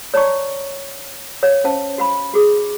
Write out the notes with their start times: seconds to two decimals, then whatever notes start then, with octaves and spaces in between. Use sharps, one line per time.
0.14 C#5 D5 A5 A#5 C#6
1.43 C#5 F5
1.64 C#4 C5 F5 A5
1.98 F#4 F5 B5
2.34 F#4 G#4 D6